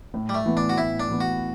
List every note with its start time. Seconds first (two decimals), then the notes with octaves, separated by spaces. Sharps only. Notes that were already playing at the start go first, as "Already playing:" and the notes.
0.14 A2
0.29 G3
0.34 A3
0.46 E3 B3
0.57 D4
0.69 F#4
0.77 A2 E4
1.00 D4
1.10 E3 B3
1.21 F#4